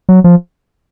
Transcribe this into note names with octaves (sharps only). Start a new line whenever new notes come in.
F#3
F3